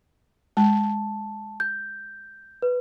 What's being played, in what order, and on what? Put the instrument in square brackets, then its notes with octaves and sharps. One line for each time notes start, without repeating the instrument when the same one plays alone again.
[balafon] G#3 [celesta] A5
[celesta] G6
B4